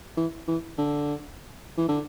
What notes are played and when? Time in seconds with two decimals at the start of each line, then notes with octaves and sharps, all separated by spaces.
0.17 E3
0.48 E3
0.78 D3
1.77 E3
1.88 D3